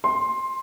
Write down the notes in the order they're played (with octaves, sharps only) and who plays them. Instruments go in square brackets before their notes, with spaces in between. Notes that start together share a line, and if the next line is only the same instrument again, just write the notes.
[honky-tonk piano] C6